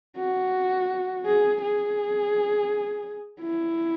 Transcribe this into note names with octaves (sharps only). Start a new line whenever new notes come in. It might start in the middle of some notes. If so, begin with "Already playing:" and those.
F#4
G#4
G#4
E4